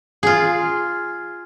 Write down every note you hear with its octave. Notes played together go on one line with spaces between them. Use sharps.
F4 G#4